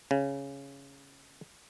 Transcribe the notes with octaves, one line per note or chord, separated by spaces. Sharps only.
C#3